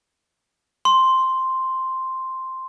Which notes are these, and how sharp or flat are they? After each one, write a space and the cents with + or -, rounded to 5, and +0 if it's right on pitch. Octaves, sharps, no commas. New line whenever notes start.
C6 +0